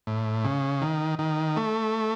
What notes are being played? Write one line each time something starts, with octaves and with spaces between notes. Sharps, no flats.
A2
C#3
D#3
D#3
A3